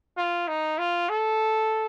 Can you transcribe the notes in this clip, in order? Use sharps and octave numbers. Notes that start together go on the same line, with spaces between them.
F4
D#4
F4
A4